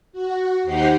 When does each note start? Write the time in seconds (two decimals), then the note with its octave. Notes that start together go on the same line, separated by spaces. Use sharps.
0.12 F#4
0.64 D#2 D#4 G4 C5 F#5 C6